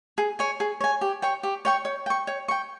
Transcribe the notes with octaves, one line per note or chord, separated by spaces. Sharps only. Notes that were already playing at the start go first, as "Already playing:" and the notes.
G#4
C#5 G#5
G#4
C#5 G#5
G4
C#5 G5 C#6
G4
C#5 G5 C#6
C#5
G5 C#6
C#5
G5 C#6